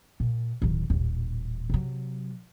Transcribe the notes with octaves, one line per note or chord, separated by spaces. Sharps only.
A#2
D1 D#3
D#1 A1
C3 F#3